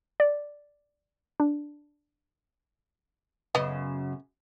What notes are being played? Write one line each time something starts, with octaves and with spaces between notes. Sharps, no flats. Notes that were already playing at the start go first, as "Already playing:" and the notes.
D5
D4
F#2 C#3 B3 D#5